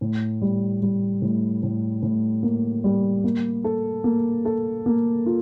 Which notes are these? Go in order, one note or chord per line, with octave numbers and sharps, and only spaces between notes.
A2
G3
G3
A2
A2
A2
A#3
G3
A#3
A4
A#3
A4
A#3
F4